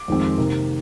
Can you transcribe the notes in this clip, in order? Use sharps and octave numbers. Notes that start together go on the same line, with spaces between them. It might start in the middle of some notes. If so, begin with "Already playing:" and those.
Already playing: D6
F2 D#3 G#3 C4
C3 D#3 A#3